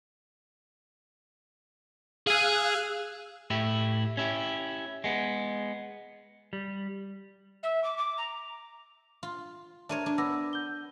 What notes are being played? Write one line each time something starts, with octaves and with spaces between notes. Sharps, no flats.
G#4 F5 G#5 E6 F#6
A2 E4 G4
C#4 E4 G4
G#3 B3
G3
E5
D6
D6
A#5
F4
D4 A#4 C#5 E5 D#7
D4
B3 D6 E6 A#6
G6 G7